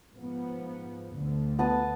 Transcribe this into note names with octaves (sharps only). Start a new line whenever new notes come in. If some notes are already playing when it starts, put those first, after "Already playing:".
G#2 F3 B3
D2 D3
B3 A5 D#6